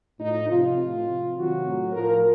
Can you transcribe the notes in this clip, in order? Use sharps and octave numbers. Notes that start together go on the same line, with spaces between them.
A2 F3 D#4
C3 F3 F4
A2 F3
C3 F3
C3 D#3 F#3 F#4
A2 F#3
A2 F3 A#4